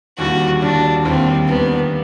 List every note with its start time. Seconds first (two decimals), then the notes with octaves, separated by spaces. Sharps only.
0.19 D#2 D3 G3 F#4
0.62 D#2 D3 G3 D4
1.05 D#2 D3 G3 C4
1.48 D#2 D3 G3 B3